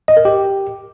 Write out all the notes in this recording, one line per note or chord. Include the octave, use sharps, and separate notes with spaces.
D#5
A#4
G4